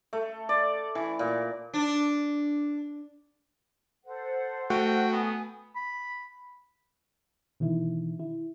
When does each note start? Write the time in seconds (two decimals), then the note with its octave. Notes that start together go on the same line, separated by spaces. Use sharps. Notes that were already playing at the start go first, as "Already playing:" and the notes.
0.13 A3
0.49 D5
0.95 E3
1.19 A#2
1.73 D4
4.05 A4 C5 F#5
4.70 A3 F#4 G5
5.13 B3 G#5 D#6
5.75 B5
7.60 B2 D#3 E3 E4
8.19 E4